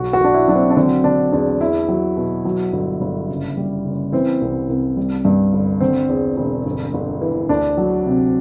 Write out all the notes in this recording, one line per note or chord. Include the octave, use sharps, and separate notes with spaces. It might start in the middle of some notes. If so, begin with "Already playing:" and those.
Already playing: B1 F#4
F#4
B1 D4
E4
F#3 D4
C4
D4
D3 C4
D3 D4
E2 D4
E2 E4
F#3
B2
F#3
G1
G1
F#1
G3
F#1
E3 C4
C2
C2
G3
G2
G1
D3 C4
E2
E1
G1
G1
E3
D2 D4
F#3
C3